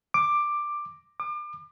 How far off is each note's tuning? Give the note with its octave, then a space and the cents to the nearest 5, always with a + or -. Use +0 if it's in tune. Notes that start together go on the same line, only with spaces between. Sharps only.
D6 +10
D6 +35